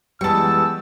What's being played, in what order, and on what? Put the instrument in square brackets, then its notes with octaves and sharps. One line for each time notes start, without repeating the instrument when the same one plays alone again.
[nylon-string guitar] E3 G3 [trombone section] G#3 B3 [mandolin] A5 C#6 [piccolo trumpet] E6